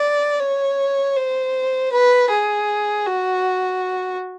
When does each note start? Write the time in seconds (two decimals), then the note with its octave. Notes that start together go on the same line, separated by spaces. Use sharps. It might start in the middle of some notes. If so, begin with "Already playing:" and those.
Already playing: D5
0.40 C#5
1.16 C5
1.92 B4
2.30 G#4
3.06 F#4